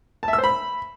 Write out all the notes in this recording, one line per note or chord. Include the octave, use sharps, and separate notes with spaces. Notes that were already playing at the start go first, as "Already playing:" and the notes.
A5
E5
E6
C5
B5